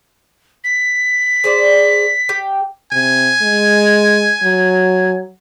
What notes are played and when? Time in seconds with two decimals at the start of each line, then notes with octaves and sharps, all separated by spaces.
0.64 B6
1.44 G#4 C5 D5
2.29 G4
2.92 C3 G#5
3.41 G#3
4.43 F#3